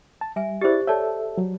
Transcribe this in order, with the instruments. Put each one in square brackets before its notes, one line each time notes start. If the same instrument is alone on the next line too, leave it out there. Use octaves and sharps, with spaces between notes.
[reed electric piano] A5
[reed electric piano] G3 [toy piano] E5 G#5
[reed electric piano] E4 D5 A6 [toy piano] G4 G#4 C5
[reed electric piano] A4 E5 [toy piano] C#5 D5 A5
[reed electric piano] F#3